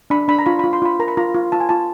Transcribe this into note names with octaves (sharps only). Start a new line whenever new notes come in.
D4 B5
D4 B5
A#5
F4 B5
F4 B5
C6
F4 B5
A#4 A#5
B5
F4 A#5
F4
F4 A5
G#5
F4 A5